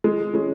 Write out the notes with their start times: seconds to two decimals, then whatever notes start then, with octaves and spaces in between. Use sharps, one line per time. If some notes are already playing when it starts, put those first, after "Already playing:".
0.04 G#3
0.33 G#3 C#4